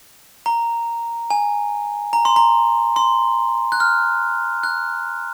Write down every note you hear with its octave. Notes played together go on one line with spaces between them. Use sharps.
A#5
G#5
A#5
C6
A#5
C6
F#6
F6
F#6